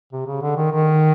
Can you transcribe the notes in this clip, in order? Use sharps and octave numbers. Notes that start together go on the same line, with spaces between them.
C3
C#3
D3
D#3
D#3